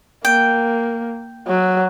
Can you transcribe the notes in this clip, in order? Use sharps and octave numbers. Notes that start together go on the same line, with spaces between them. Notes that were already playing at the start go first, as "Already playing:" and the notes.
A#3 G5
F#3